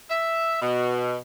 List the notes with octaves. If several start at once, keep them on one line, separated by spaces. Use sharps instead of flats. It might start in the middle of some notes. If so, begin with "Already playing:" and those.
E5
B2